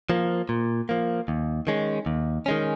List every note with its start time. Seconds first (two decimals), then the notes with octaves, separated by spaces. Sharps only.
0.10 F3 A#3
0.49 A#2
0.89 F3 A#3
1.28 D#2
1.67 D#3 G#3 C#4
2.06 D#2
2.46 D#3 G#3 C#4